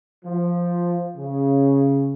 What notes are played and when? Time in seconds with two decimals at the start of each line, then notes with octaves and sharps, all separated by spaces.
0.25 F3
1.16 C#3